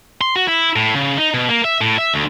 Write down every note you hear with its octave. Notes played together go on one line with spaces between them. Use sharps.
C6
F#4
E4
A2
C#3
D#4
B2
A#3
E5
A2
E5
D2